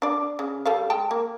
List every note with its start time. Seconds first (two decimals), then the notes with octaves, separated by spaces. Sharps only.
0.02 D4 D5
0.39 C#3
0.66 G3 A4 F5
0.90 G#3 G5 A5
1.11 A#3